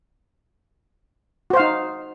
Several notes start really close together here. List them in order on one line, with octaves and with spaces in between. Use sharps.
F#4 C5 F5 D#4